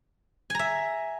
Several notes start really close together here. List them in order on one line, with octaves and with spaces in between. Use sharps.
G#5 A#5 E5